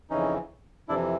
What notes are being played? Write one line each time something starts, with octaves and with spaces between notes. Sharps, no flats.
F2 C#3 E3 C#4 D#4
F2 C3 E3 D4 E4